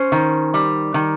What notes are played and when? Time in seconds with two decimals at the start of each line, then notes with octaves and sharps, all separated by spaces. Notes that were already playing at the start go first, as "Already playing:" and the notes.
Already playing: C#4 C5
0.12 D#3
0.54 G3
0.94 D#3